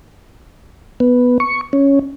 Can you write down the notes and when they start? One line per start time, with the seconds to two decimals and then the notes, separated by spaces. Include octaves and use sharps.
1.00 B3
1.40 C#6
1.73 C#4